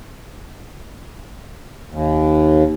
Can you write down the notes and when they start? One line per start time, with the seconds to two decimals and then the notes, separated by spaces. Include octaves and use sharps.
1.91 D#2